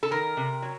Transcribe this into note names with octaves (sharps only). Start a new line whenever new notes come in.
A4
D#3 A#4
C3
F#3